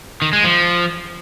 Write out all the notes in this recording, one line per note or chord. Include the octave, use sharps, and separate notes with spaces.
D#3
G#3
F3